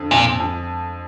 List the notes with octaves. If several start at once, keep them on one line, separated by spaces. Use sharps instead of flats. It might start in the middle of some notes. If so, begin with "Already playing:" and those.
Already playing: F2 D3
F2 A#2
F2